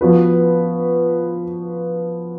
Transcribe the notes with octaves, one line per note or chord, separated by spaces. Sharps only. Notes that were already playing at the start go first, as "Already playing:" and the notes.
F3 B3 F#4 B4